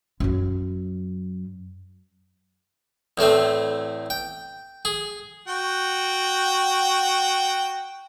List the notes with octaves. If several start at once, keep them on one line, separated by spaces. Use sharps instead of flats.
F#2 F#3
E2 A2 A3 C4
G5
G#4
F#4 G5